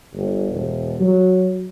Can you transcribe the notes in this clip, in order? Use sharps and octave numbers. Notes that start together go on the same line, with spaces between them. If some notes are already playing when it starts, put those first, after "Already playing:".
G1
E1
F#3